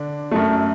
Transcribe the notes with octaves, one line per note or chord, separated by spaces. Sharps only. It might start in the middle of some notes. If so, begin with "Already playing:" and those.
Already playing: D3 D4
F#2 F#3 A3